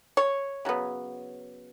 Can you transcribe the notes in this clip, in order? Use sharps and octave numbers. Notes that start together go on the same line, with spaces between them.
C#5
C#3 F#3 B3